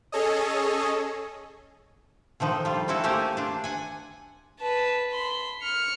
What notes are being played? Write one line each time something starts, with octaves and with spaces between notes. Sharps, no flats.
C#4 G#4 A4 C#5 D#5
D3 D#3 F3 D#4
G3 F4
C4 C#4 E4 F#4 A4
A3 A#3 C#4 G4 C5 G#5
D4 F4
F#5 G#5
B4 A5
B5 C6
F6 C#7